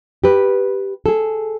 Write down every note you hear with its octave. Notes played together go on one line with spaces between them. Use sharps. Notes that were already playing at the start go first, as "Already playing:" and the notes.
G4 B4
G#4 A4